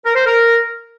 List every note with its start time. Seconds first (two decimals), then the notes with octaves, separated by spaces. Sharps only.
0.05 A#4
0.15 C5
0.26 A#4